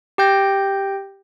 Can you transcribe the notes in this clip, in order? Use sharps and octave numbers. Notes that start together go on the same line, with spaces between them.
G4 G5 G6 A#6